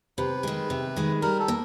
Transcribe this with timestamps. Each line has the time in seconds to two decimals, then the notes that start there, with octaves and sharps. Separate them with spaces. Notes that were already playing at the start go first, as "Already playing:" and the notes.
0.18 C3 B4
0.43 D#3 G#3
0.70 C3
0.97 D#3 G#3
1.22 G3 A#4
1.40 A4
1.48 A#3